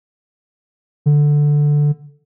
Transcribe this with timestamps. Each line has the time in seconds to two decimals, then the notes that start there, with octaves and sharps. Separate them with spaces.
1.06 D3